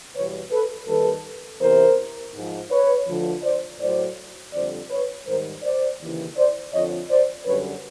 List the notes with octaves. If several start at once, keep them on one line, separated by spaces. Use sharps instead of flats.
E2 B2 G3 B4 C#5
A4 B4
D#2 D#3 G3 A4 B4
E2 C3 E3 A#4 C5
G#2 F3
B4 C#5
D2 D3 F3
C5 D5
A2 F#3 C5 D5
F2 D3 G3 C5 D5
B4 C#5
G#2 D#3 G3 A#4 C5
C5 D5
D#2 C#3 E3
C5 D5
F2 D3 F3 C#5 D#5
C5 D5
F#2 D3 G3 B4 C#5